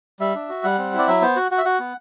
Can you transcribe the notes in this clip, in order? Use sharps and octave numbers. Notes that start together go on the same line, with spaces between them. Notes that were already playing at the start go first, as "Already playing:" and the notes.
G3 E5
D4
F#4
G3 F#5
C4
E4
D5
F#3 E5
B3 C5
F#4 F#5
F#4 F#5
E5
F#4 F#5
B3